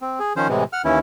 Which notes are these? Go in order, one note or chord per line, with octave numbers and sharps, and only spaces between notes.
C4
G#4
D#3 F3 C#4 C5
A2 C3 E3 G#3
F#5 F6
D#2 E3 C#4 E4